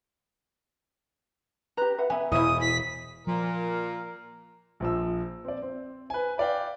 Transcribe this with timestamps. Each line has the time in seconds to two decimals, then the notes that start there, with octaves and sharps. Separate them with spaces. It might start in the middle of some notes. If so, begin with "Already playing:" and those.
1.77 G4 B4 A#5 F#6
1.98 B4 E5 F#5
2.10 B3 E5 G#5
2.32 E1 E2 E4 D#6
2.61 B6
3.27 A#2 F3 A#4
4.80 A#1 F3 E6
5.45 C4 D5
5.62 C4
6.10 B4 G#5
6.38 B4 D5 F5 G5